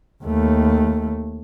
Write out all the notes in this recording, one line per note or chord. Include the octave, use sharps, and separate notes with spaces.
D#2 A3